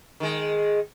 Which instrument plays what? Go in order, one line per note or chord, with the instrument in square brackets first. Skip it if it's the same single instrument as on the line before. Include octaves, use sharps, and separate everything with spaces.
[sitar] D#3 G#3